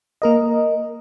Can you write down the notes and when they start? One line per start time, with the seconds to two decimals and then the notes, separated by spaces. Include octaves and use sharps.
0.22 A#3 A#4 D#5